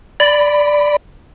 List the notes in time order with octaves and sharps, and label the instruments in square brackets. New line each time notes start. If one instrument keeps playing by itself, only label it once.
[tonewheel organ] D5 B5